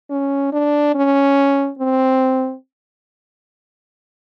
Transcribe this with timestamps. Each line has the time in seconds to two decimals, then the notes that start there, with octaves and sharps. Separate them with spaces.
0.10 C#4
0.52 D4
0.95 C#4
1.79 C4